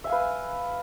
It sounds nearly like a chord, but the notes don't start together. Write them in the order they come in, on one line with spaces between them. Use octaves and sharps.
E5 G#5 F5 B4